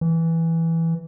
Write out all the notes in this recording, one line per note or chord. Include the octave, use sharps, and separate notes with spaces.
E3